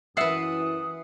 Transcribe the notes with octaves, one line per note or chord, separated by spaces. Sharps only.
F#2 E3 B4 E5 F#5 D#6 A6 C7